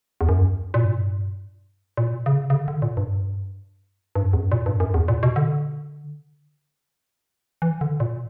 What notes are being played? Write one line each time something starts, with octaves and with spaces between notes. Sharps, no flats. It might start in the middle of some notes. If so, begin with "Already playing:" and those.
E2
F#2
A#2
G2
A#2
C#3
C#3
D3
D3
A#2
G2
G2
F#2
E2
F#2
A#2
G2
F#2
E2
A#2
B2
D3
E3
D3
A#2